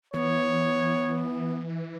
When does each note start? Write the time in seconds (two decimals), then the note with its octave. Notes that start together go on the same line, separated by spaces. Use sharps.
0.14 E3 B3 C#5